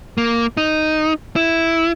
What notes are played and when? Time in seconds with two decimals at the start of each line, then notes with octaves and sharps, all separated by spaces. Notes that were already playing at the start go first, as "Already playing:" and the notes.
0.18 A#3
0.57 D#4
1.36 E4